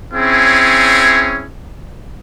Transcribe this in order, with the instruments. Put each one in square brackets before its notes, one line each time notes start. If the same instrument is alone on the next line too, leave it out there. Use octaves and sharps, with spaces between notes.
[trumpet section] C4 C#4 E4 G#4 C#5